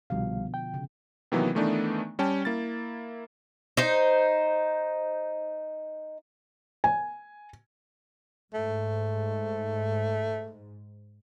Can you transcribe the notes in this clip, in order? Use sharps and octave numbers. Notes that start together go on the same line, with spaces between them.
C2 B2 D3 F3 G3 F5
G5
C#3
C3 D#3 E3 F#3 A#3 B3
D#3 E3 A3 B3 D4 D#4
G3 C#4 G5 A5
A#3 E4 A6
D#4 C5
G#5
G#2 A3